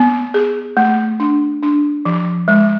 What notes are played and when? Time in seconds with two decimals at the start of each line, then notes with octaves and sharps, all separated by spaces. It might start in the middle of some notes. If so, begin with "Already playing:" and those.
Already playing: B3
0.34 G#4
0.77 A3
1.20 D4
1.63 D4
2.05 F3
2.48 G#3